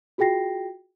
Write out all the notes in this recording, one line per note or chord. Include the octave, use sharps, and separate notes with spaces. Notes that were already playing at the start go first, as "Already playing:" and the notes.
F4 F#4 G#4 G5 A#6 C7